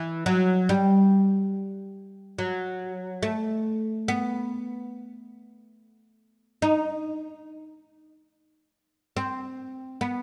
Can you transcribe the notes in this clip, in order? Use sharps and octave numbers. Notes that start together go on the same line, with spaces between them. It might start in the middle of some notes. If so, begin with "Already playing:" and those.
Already playing: E3
F#3
G3
F#3
A3
B3
D#4
C4
B3